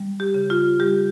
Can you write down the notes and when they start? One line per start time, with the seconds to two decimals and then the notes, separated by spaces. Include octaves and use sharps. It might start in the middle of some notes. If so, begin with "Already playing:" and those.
Already playing: G3
0.20 G4
0.34 C#3
0.50 F4
0.80 G3 G4